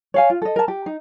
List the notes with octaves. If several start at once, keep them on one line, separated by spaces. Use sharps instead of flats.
C#5 F5 G#5
F4
A4 D#5
A#4 A5
G4
D#4